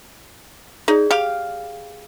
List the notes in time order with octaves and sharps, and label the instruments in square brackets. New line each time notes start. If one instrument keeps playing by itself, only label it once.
[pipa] D#4 [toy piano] G#4 D5
[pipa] G4 F5